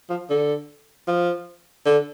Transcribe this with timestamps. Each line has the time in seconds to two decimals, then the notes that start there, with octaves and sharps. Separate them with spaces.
0.10 F3
0.30 D3
1.07 F3
1.86 D3